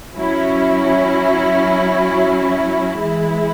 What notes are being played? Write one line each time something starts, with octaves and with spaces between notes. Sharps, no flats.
F#3 C#4 E4
E3 G#3 E4